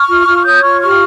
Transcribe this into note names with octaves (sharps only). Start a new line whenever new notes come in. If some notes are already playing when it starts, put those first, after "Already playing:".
Already playing: C#6 F6
F4
F4
C#5 D#6 G6
F4 C#6 F6
G4 C#6 F6